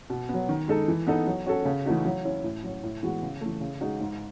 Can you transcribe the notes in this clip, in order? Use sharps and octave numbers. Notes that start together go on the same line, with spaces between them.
B2
F#3 B3
D#3
G#3 D#4 A4
E3
B3 D#4 A4
F#3
C#4 F#4 A4
C#3
E3 A3 D#4 F#4
F#3
C#4 E4
A2
F#3 C#4
A2
E3 G#3 B3 F#4
C#3
E3 A3
C#3
G#3 D#4 F#4
G#2